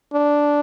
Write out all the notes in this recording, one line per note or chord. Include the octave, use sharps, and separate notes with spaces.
D4